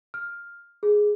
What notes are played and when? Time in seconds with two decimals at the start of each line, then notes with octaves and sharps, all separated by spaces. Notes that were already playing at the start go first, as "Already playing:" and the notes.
0.14 F6
0.83 G#4